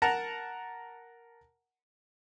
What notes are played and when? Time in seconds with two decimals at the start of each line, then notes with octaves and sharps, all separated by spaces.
0.02 A#4 F#5 A5 A#5